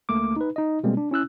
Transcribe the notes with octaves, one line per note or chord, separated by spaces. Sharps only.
C#2 A3 A#3 D6
D#4 B4
D#4 D#5
B2 G3 G#3 A#3 C4
D4
C#4 E4 E6 F#6